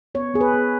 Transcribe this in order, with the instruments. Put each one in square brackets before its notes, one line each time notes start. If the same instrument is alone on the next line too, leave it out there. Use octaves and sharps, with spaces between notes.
[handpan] B3 C#5
B3 G#4
B4
B3